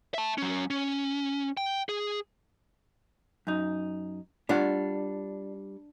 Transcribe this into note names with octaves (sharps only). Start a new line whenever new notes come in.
E5 A5
F#3 C#4
C#4
G5
G#4
F#2 D#4
G3 D4 F4 F#5